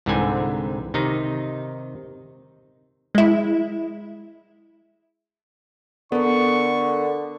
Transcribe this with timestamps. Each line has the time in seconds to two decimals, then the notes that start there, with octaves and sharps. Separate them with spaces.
0.06 C2 G#2 D3 E3 C4 G#5
0.94 C3 D#3 D#4
3.15 G#3 E4
6.12 D3 B3 A4 A#4 C#6